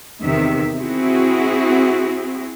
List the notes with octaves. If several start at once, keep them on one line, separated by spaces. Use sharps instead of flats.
E2 C3 D#3 E5
C4 E4 F#4 G#4